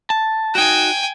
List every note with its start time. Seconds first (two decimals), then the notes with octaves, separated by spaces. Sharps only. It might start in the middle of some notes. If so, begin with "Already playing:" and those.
0.10 A5
0.55 D#4 F#4 G5 G#5